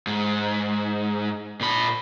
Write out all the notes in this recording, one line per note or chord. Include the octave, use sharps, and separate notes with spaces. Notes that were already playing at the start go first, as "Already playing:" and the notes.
G#2
A#2 B5